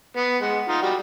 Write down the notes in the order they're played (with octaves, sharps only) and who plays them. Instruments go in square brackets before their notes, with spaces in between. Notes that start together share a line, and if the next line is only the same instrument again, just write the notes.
[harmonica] B3
G#3 F#5
D#4 F4
G3 F#4